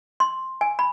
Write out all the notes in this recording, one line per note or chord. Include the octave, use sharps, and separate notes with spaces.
C6
G#5
B5